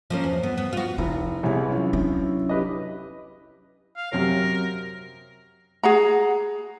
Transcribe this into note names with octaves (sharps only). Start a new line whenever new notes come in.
F3 A#3 C#4
E2
B3
B3
F4 F#4
F1 E4
C2 C3 E3 G#3 B3 G4 C#5 B5
F#3 C#4 E4 F4
D4
G4 B4 D#5
F5
F#2 C3 C#4 A#4
G#4 F#5 A#5